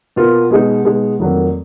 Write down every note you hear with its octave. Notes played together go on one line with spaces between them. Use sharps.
B2 A#3 F4
B2 G#3 D#4 G#4
B2 G#3 D#4 G#4
F1 F2 D#3 F#3 A#3